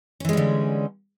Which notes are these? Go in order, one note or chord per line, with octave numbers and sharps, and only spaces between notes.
D3 E3 G3 G#3 C#4